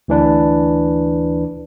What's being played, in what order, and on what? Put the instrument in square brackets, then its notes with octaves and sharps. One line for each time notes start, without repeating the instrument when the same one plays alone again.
[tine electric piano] D2 E3 D4 B4